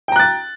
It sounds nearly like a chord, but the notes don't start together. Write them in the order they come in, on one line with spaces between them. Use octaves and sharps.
G5 A#5 F#6 A6